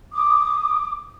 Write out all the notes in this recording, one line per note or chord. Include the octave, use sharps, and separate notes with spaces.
D6 D#6